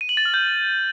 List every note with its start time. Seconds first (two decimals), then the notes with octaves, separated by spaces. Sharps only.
0.01 D#7
0.09 F#7
0.17 A6
0.25 F6
0.34 G6